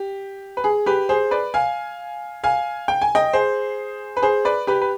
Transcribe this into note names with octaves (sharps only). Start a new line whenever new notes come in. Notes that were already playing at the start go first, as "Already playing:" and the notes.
Already playing: G4
B4
G#4
G4 B4
G#4 C5
B4 D5
F5 G#5
F5 G#5
G5
G#5
D#5 G5
G#4 C5
B4
G#4 C5
B4 D5
G4 B4
B4